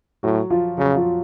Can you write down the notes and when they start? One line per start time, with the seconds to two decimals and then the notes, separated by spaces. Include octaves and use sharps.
0.23 A2 F#3 F#4
0.50 F3 F4
0.78 C#3 F#3 F#4
0.96 F3 F4